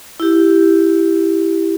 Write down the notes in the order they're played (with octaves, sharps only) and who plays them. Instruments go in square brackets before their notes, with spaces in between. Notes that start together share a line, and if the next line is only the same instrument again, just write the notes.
[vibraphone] E4 G4